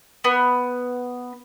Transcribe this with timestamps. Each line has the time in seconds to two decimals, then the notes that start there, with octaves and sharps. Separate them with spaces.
0.24 B3